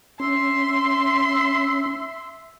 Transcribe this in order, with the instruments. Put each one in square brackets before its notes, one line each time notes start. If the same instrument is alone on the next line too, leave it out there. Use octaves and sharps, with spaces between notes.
[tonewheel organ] C#4 [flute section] E5 E6 [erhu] C6